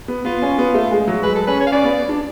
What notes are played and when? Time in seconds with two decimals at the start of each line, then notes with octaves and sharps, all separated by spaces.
0.08 B3
0.25 B3 F4
0.42 C#4
0.58 B3
0.74 A3
0.91 G#3
1.08 F#3
1.23 G#3 B4
1.35 A4
1.47 C#4 B4
1.60 C#5
1.67 F5
1.72 C#4 D5
1.84 B3
2.09 D4